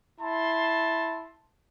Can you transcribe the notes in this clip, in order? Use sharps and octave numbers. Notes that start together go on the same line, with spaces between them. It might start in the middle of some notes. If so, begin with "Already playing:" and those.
E4 A5 C6